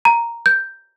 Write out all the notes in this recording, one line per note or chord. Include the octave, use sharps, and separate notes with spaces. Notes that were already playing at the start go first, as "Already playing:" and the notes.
A#5
G6